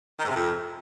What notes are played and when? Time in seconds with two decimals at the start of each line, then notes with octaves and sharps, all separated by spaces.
0.20 D#3
0.25 G#2
0.30 C3
0.35 F2